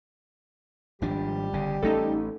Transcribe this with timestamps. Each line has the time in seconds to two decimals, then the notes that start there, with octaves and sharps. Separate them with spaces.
1.02 G#1 F3 G3 D4 G4
1.53 G1 C#3
1.83 A1 A3 C#4 D#4 A4